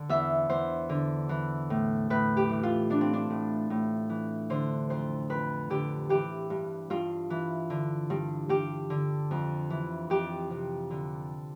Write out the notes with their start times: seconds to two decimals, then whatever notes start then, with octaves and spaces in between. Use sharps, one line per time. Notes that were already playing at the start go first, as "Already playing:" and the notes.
Already playing: D3
0.09 E2 E5
0.49 E2 C5
0.89 D3
1.29 E3
1.70 A2
2.10 A2 B4
2.37 G4
2.49 E3
2.63 F4
2.90 E3 D4
3.01 C4
3.13 D4
3.30 A2
3.70 A2
4.09 E3
4.50 D3 C5
4.90 F2 C5
5.30 F2 B4
5.70 D3 G4
6.09 E3 G4
6.50 G2
6.90 G2 F4
7.30 E3
7.70 D3
8.10 G2
8.49 G2 G4
8.90 D3
9.31 F2
9.70 E3
10.10 F2 G4
10.50 C3
10.90 D3